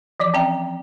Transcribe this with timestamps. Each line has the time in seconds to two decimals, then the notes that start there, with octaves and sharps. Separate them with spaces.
0.20 E3 F3 D5 D6
0.34 C4 C#4 E5 G5 A#5